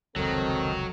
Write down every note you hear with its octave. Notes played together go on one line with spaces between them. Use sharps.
F1 C#2 D#3 F#3 C4 A4